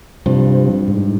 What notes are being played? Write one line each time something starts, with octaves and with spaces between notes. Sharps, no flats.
G2 C3 F3
G#2